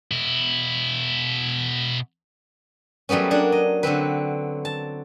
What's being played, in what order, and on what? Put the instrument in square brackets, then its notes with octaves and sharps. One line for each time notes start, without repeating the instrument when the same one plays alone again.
[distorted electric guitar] B2 E4
[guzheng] F#3 G3 A3 B3 C#4
A#3 D4 C#5 F#5
D#5
D3 F#3 C4 B4
A5